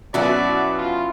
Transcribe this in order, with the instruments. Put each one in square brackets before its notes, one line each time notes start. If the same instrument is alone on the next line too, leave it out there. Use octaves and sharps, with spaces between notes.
[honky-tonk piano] B2 F#4 E5 [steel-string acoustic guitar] F#3 C#4 E4 [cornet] D5
[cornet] F4